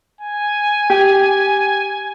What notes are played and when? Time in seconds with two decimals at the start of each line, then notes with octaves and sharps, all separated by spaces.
0.21 G#5
0.90 G4